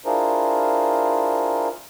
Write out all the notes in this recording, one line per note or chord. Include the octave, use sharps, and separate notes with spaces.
D4 E4 F4 G#4 A#4 C5